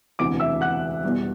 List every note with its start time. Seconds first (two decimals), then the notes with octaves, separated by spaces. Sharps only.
0.19 E1 D2 C3 E3 D6 D7
0.40 E5 E6
0.61 F#5 F#6
1.04 E2 B2 G3